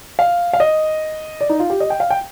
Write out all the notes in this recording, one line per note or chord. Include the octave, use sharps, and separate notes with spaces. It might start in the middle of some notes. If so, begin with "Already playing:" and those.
F5
F5
D#5
D5
D#4
F4
G4
D#5
G5
F5
G5